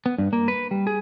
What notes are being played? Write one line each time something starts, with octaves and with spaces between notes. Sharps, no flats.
B3
G2
A#3
B4
G3
G#4